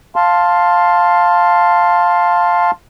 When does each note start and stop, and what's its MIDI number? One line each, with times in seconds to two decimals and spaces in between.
0.16 2.71 77
0.16 2.71 81
0.16 2.71 84